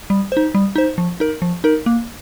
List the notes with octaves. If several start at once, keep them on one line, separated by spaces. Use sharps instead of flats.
G3
D#4 C5
G3
D#4 C5
F3
D#4 A#4
F3
D#4 A#4
A#3